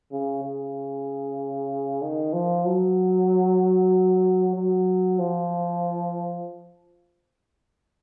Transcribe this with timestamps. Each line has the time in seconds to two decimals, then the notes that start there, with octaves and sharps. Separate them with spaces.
0.12 C#3
0.43 C#3
2.02 D#3
2.33 F3
2.65 F#3
4.55 F#3
5.19 F3